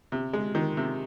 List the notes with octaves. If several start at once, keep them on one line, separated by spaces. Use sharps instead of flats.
C3
G#3
D#3
C3